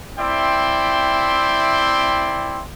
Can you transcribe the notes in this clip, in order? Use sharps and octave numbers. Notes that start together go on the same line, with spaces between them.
C4 E4 D5 E5 G5 C6